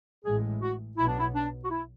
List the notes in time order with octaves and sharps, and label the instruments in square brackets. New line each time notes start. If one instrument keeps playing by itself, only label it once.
[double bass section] A1 A2 G#3 [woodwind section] G#4
[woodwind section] F#4
[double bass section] B1 B2 F#3 B3 [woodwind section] E4
[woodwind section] D4
E4
D4
F#4
E4